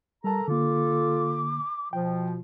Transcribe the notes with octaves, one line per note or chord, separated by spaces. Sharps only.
G3 A4 A#4 A5 A#5
D3 A#3 F4 A4 D6
B2 F3 F4 G5